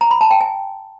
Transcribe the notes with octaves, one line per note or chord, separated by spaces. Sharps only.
A#5
B5
A5
G5
G#5